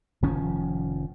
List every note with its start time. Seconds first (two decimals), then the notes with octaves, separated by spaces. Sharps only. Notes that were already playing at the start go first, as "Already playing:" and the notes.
0.22 F1 D#3 F3 C#4